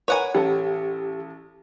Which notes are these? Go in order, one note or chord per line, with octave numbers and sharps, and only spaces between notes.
A#4 B4 C#5 F#5 G#5
A1 G4 A4